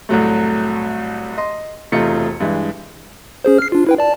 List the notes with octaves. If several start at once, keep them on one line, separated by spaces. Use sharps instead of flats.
C2 A2 F#3 A3
D#5 C6
E1 C3 A3 D#4 F4 C#7
G2 E3 G#3
C#4 G#4 C5
F6 C7
D4 F4
E4 B4 G5
D5 A5